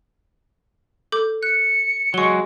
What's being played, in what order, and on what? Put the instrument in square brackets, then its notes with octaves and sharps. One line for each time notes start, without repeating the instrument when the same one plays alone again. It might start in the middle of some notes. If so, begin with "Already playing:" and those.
[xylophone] A4 D6 G6
[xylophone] F#6 [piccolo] C#7
[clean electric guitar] F#3 G#3 [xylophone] C#6 G7